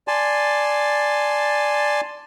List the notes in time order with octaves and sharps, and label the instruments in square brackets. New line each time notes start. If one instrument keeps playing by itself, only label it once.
[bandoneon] D5 G#5 A5 C6